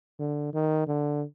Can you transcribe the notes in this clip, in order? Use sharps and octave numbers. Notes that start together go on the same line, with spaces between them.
D3
D#3
D3